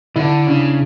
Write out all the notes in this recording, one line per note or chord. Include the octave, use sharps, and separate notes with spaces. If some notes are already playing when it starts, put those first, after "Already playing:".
D3 E4
C#3 D4